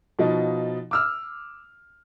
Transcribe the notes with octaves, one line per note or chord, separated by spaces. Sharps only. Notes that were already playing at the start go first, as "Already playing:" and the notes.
B2 F3 D#4
D6 E6 F6